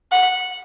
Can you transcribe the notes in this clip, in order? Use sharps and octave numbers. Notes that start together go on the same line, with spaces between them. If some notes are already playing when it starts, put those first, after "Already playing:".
F#5